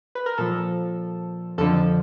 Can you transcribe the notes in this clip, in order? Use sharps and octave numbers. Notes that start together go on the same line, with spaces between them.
B4
A#4
A#2 F3 A4
F2 D3 F3 A4